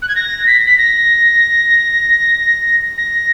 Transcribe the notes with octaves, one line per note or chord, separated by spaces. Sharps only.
F#6
G#6
A#6
B6
B6
A#6
A#6